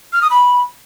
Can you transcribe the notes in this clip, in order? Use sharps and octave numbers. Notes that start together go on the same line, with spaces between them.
F6
D#6
B5